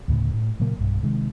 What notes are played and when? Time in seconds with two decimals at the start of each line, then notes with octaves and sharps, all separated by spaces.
0.08 D2 A2 C#3
0.34 A2
0.60 A#2 C#3 F#3 A#3
0.79 B1 G2
1.03 C3 D#3 G#3